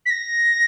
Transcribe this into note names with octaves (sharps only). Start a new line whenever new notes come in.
B6
A#6